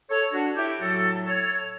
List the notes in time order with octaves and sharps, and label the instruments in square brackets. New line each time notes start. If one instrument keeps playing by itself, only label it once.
[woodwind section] A4 C#5
D4 F#4
E4 G4
A2 F#3 F#4 A4
A4 C#5